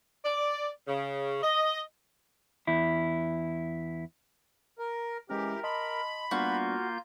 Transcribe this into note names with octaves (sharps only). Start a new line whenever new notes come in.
D5
C#3
D#5
E2 E4
A#4
E3 G#3 C#4 G4 A#4
D#5 A5 B5 C6
G3 A#3 B3 D4 F4 F#4 G6